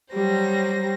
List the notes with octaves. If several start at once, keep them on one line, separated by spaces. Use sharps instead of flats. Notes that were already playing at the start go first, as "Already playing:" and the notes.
F#3 G3 C5 A#6